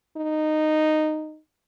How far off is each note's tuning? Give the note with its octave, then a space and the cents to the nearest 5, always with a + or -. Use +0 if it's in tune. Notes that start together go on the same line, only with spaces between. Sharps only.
D#4 -10